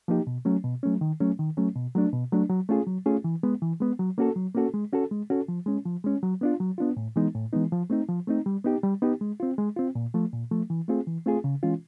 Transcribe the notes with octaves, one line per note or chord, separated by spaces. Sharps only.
F3 A#3 D#4 G4
B2
F#3 A3 C#4
B2
F#3 A3 C#4
D#3
F#3 A3 C#4
D#3
F#3 A3 C#4
B2
F#3 A3 D4
B2
F#3 A3 D4
F#3
A3 C#4 F4 G#4
F#3
A3 C#4 F4 G#4
E3
G#3 B3
E3
G#3 B3
F#3
A#3 C#4 F#4 A4
F#3
A#3 C#4 F#4 A4
G#3
C#4 F#4 A4
G#3
C#4 F#4 A4
F3
G#3 C#4
F3
G#3 C#4
F#3
B3 D4 F4
F#3
B3 D4 F4
A2
E3 G#3 B3 D#4
A2
E3 G#3 B3 D#4
F3
A3 C4 D#4
F3
A3 C4 D#4
G3
B3 D#4 G4
G3
B3 D#4 G4
G#3
C4 F4
G#3
C4 F4
A#2
F3 A3
A#2
F3 A3
E3
A3 C4 F4 G#4
E3
A3 C4 F4 G#4
C#3
E3 G#3 C#4 F4